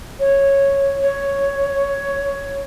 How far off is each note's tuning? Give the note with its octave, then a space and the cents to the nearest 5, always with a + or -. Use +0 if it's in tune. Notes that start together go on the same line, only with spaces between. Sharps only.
C#5 -5
C#5 +5